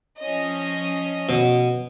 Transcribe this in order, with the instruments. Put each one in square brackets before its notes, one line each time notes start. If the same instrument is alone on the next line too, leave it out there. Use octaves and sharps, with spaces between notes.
[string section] F3 C#4 D#5
[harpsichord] B2